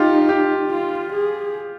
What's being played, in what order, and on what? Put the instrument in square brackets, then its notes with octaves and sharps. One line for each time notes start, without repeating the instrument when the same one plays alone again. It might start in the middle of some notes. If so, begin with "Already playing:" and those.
Already playing: [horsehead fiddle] D#4 [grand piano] F4 G4
[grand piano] G4
[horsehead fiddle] F4
G#4